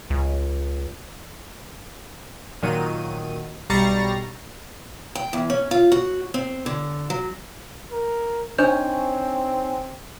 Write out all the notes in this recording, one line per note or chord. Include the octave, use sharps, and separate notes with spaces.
C#2
A#2 D#3 F#3 D#7
B1 G3 A#5 C#6 A6 C7
G5
E2
C#4
F4
F#4
C4
D3
F#3
A#4
C4 D4 D#4 C5 C#5 G#5 G6